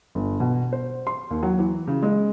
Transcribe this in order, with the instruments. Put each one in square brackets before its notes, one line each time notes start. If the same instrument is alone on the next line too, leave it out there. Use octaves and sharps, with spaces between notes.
[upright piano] G1
B2
C5
C6
D#2
F#3
E3
C#3
G#3